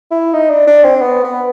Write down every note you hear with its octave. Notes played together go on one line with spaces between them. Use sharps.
E4
D#4
D4
D4
C4
B3
B3